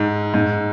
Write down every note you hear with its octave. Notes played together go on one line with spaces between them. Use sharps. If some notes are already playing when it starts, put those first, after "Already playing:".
Already playing: G#2
G#2